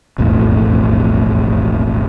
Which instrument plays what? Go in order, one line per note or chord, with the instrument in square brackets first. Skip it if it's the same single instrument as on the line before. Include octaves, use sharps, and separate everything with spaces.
[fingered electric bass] E1 A#1 F2 A2